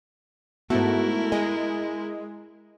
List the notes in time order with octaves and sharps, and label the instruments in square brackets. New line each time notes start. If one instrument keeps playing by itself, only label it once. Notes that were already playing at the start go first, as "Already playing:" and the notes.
[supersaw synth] G#2 A3 [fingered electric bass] B3 [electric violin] E4 A#4 [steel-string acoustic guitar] F#4
[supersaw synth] G#3 [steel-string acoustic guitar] D#5